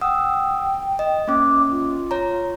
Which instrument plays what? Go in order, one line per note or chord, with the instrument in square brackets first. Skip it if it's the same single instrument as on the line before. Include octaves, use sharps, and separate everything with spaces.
[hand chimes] F#5 D#6 E6 [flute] G5
[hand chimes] D#5
[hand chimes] A#3 C#4 [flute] D6
[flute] F4
[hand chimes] C#5 A#5